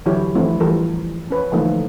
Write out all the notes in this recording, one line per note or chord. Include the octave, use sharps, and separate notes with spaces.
D3 E3 F#3 E4 G4 C#5
E3 F3 A3 C4 D4 E4
E3 G3 F4 A4 A#4
C#4 B4 C#5
D3 E3 F3 A3 A#3 D#4